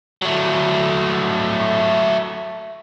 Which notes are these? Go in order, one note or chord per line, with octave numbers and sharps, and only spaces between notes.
F#3 A3